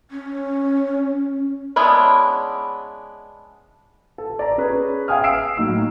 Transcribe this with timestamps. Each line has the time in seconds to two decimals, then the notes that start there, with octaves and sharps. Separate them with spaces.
0.11 C#4
1.76 G#3 B3 C#4 D4 E4
4.18 A4
4.39 D5 A#5
4.58 C#4 G#4 B4
5.08 E5 F5 G5 G#5 D#6 F6
5.24 D#6 E6 C7 D7 E7
5.57 A2 F#3 D#4 E6